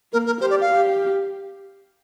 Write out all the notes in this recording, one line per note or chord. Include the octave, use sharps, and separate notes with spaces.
A#3 A#4
A#4
G4 C5
D5
F5
G4